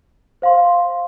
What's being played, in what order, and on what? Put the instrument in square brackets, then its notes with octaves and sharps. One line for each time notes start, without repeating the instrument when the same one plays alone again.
[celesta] C5 F5 C6